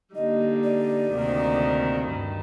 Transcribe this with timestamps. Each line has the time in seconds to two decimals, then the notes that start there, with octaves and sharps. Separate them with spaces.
0.15 D3 G3 A#3 D#4 D#5
0.63 D5
1.12 D2 C3 D#3 A#3
2.09 G2 D#3 G3